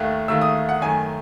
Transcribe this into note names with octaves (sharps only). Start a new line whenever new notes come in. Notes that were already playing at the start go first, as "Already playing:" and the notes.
Already playing: D#2 D#3 A3 F#6
D#2 D#3 A3 E6
D#6
F#5
F#2 D#3 A3 G#5